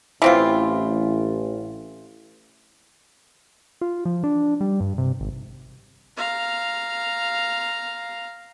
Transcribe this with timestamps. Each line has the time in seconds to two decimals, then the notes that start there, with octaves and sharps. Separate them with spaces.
0.22 A1 E3 C4 F4
3.81 F4
4.05 F3
4.24 D4
4.61 G3
4.80 G2
4.98 C3
5.20 G#1
6.17 F5 A#5